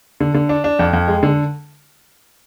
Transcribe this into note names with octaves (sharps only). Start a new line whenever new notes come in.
D3
D3
D4
D4
F2
F2
G#3
D3